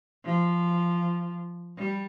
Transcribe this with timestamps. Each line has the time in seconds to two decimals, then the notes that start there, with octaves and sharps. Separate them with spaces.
0.25 F3
1.77 G3